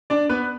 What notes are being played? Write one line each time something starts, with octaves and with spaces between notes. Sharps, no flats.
D4 D5
B3 B4